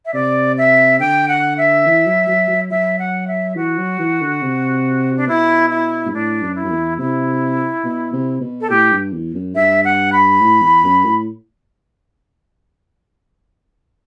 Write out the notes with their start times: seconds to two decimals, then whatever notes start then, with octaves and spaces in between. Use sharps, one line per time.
0.06 E5
0.14 C3 D5
0.58 E5
1.00 D3 G5
1.28 F#5
1.58 E5
1.86 E3
2.07 F#3
2.29 F#3
2.49 F#3
2.71 F#3 E5
2.99 F#5
3.28 E5
3.56 E3 F#4
3.79 F#3
3.99 E3
4.21 D3
4.42 C3
5.16 D4
5.28 B2 E4
5.70 E4
6.06 G2
6.13 A2 D4
6.42 F#2
6.56 E4
6.65 F#2
6.71 E2
6.99 C3 E4
7.84 B2
8.13 C3
8.41 B2
8.61 A4
8.70 A2 G4
8.92 G2
9.13 E2
9.35 F#2
9.55 G2 E5
9.85 F#5
10.13 B5
10.41 A2
10.62 E2
10.84 F#2
11.05 A2